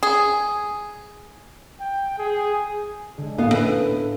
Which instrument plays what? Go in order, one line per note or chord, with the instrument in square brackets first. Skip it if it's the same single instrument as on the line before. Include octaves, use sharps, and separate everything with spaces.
[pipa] G#4
[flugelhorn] G5
G#4
[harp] D3 G#3
[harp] A2 [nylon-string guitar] B3 F5
[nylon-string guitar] B4